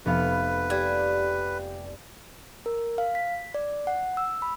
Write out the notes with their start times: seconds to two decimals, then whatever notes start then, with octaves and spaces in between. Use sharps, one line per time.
0.05 F1 B3 B4 F5
0.70 G3 G#6
2.66 A#4
2.98 F5
3.15 B6
3.54 D5
3.87 F#5
4.17 E6
4.42 B5